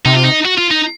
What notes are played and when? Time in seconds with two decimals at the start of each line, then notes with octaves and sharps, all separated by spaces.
0.05 C3 D#4
0.14 F4
0.24 D#4
0.45 F#4
0.58 F4
0.71 D#4